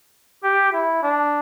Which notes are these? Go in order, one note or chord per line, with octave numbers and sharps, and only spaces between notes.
G4
E4
D4